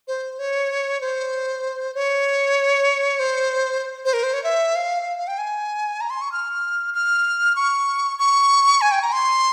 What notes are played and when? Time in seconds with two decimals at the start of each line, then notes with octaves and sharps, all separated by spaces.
0.08 C5
0.39 C#5
1.01 C5
1.94 C#5
3.19 C5
4.05 C5
4.13 A#4
4.23 C5
4.33 C#5
4.44 E5
4.76 F5
5.18 F5
5.28 G5
5.38 G#5
6.01 A#5
6.10 C6
6.21 C#6
6.32 F6
6.94 F6
7.56 C#6
8.19 C#6
8.81 G#5
8.92 G5
9.02 A#5
9.12 C6